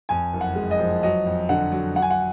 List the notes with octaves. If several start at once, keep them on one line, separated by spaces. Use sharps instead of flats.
F2 G#5
F#1
F#5
G#3
D#5
F3
F#3 D#5
F2
D3 F#5
F#3
F#3 F#5
G#5
F#5